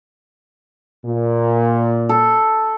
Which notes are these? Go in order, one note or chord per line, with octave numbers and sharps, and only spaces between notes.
A#2
A4